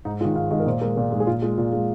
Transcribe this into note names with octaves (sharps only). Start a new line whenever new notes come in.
G#2 D#4
D#3 G#3 F4
G#2 F5
D#3 G#3 D#5
A#4
A#2 C5
G#3 A#4
A#2 A#4
G#3 D#4
G#4
A#2 F4
G#3 F4
A#2 F4
G#3